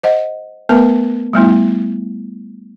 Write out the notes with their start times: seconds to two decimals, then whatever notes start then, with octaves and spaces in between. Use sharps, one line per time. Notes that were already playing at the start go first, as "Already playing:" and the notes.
0.03 C5 D#5 F#5
0.69 A3 B3 A#4 B4 A5
1.33 G3 A3 B3 E4